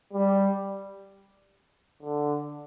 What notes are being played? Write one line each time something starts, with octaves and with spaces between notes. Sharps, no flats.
G3
D3